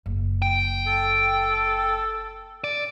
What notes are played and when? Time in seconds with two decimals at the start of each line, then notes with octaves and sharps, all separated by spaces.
0.06 F#1
0.42 G5
0.87 A4
2.64 D5